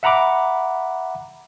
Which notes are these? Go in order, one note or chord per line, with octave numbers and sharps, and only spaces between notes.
E5 F#5 A#5 B5 D6